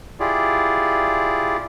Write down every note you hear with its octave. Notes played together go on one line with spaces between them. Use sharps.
E4 F4 G4 G#4 D5